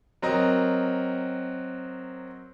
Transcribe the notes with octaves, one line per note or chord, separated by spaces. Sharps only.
F#3 C4 A#4 D#5